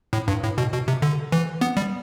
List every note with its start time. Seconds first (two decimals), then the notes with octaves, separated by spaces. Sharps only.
0.13 A2
0.28 G2
0.43 A2
0.58 B2
0.73 B2
0.88 C3
1.02 D3
1.32 E3
1.61 B3
1.77 G3